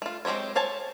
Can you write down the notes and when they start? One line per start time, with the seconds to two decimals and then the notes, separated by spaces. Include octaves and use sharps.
0.02 A3 F4
0.25 G#3 C4 G4 C5 C#5
0.55 C5 C#5 G#5 A5